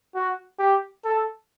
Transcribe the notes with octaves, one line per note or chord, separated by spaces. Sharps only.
F#4
G4
A4